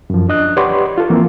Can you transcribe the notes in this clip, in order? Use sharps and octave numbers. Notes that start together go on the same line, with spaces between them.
F#2 F3
D4 D#5 F#6
G4 B4 C#5 D5 F#5 C6
F4 A4
E3 F3 A#3 C4